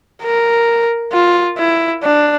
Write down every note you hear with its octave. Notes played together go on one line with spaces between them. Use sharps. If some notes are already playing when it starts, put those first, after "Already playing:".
A#4
F4
E4
D4